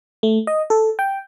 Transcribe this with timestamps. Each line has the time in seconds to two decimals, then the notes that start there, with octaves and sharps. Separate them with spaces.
0.23 A3
0.47 D#5
0.70 A4
0.99 G5